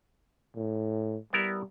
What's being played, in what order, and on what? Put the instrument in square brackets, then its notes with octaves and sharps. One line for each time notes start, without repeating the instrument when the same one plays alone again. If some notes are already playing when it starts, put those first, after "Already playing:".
[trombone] A2
[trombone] G3 [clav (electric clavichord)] B3 E4 A#4